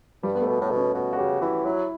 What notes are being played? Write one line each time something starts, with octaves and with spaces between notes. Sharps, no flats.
G2 G3
B3
A3
B2
A2 B3
B2
C#4
B2 F#4
F#4
C#3 G4
E3 E4
F#3 E4